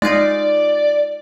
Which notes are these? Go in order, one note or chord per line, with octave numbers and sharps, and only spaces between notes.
G#3 D#4 F4 D5